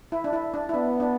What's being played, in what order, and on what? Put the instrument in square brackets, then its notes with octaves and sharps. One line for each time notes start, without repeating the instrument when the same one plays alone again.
[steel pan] E4
D4
E4
D4
E4
[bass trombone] B3 [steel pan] D4
[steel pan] D4